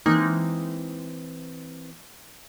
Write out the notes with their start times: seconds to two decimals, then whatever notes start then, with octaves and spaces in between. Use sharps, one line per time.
0.06 E3 G#3 A#3 C4 D#4